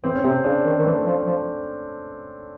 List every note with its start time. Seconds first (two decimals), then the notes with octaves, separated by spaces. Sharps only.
0.04 E3 C4
0.15 C#4
0.23 C3 C4
0.44 C#3 D4
0.65 D#3
0.78 D#3
0.85 E3 A3
1.06 F3
1.26 F3